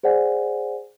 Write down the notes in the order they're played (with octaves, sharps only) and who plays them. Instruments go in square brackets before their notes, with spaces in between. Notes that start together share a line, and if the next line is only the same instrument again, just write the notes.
[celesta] G#4 C5 D5 F#5 G#5